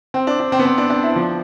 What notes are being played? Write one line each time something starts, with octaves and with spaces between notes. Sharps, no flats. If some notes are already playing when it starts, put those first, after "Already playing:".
C4
D4
D4
C4
B3
C4
D4
D4
E4
F3